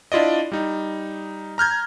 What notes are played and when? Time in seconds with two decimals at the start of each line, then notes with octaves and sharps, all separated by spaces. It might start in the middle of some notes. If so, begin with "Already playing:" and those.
0.12 D4 E4 F4 D5 D#5
0.52 G3 D#4
1.58 A#5 F6 G6 G#6